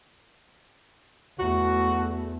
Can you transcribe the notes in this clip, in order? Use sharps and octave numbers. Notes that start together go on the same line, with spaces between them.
E2 A3 F#4